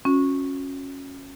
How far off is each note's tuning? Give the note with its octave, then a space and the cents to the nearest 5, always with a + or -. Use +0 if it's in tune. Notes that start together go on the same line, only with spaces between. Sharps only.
C#4 -10 F#4 -30